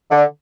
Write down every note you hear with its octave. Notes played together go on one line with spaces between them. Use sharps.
D3